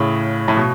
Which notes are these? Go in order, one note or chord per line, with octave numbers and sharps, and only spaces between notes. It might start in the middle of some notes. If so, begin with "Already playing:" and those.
Already playing: A2 C#3
A2
B2